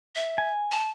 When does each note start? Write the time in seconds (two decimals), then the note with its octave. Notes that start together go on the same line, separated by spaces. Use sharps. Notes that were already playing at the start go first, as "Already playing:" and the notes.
0.16 E5
0.38 G#5
0.71 A5